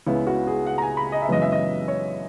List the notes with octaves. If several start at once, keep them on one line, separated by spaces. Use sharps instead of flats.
C#2 C#3 G#3 B3 E4
F#4
G#4
F#5
A#5
G#5
B5
D#5
E5
F#2 C#3 E3 G#3 B3 D#5
E5
D#5
C#5